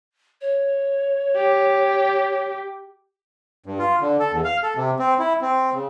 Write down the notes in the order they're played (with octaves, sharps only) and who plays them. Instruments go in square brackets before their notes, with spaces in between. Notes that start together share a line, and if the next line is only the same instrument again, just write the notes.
[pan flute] C#5
[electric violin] G4
[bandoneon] G2
F4
D3
A4
E2
F5
A4
C3
C4
E4
C4
C#3